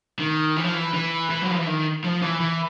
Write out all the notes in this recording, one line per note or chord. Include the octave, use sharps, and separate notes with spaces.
D#3
E3
F3
E3
E3
E3
F#3
F3
E3
D#3
F3
E3
E3